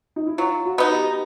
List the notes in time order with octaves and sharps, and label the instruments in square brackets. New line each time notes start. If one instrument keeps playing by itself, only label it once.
[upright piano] D#4
E4
[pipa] F#3 [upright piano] F4
[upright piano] F#4
[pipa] B3 D#4
[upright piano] G4